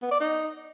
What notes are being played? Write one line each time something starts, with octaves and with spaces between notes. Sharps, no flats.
B3
D5
D#4